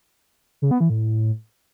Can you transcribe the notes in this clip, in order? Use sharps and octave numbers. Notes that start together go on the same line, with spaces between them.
C#3
B3
E3
A2